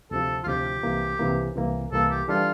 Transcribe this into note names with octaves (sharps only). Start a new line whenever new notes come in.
D2 C3 F3 A4
F4
D2 C3 F3 G4
C2 C3 E3 A#3
C2 C3 E3 A#3
C2 C3 E3 A#3
C2 C3 E3 A#3 A4
G4
E3 G3 D4 F4 A4